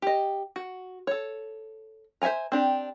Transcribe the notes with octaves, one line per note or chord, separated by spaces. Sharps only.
G4 D#5
F#4
A4 C#5
C5 E5 F#5 G#5 A#5
C4 D4 G4